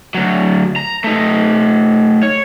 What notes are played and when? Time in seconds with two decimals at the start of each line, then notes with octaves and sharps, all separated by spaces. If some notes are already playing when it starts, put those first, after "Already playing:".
0.15 D2 F#3
0.76 A#5
1.04 A3 D#4
2.23 C#5